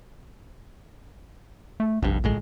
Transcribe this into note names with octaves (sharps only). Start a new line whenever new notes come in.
A3
F1 A#1 G2
G1 A2 G#3